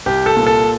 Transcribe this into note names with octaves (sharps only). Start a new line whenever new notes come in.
C2 G4
A4
A#2
A4